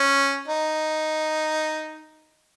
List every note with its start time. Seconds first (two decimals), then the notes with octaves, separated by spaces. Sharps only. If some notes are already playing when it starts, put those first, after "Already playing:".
Already playing: C#4
0.48 D#4